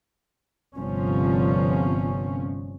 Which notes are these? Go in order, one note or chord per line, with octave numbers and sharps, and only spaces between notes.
G1 C3 F3 C#4